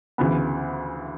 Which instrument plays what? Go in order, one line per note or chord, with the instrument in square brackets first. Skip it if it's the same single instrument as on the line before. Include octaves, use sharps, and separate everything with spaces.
[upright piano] D2 C#3 E3 B3